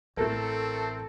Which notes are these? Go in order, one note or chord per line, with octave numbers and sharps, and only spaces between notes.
A1 A3 C4 A4 A#4